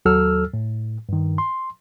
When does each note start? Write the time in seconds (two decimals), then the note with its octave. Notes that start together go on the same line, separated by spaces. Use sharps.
0.05 D#2 F#3 A4 E6 F6
0.54 A2
1.09 G2 D#3
1.38 C6